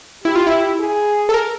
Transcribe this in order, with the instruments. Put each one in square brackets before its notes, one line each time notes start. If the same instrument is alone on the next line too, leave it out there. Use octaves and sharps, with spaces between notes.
[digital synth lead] E4 [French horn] G4
[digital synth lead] F4
E4
[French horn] G#4
[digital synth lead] A4
A#4